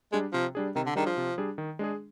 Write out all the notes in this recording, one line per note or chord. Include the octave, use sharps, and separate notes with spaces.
G3 G#3 D4 G#4
C3 F3
G3 D4 G#4
C3 D#3
D3
D#3 G3 D4 G#4
F3
C3
G3 D4 G#4
D#3
G#3 D4 G#4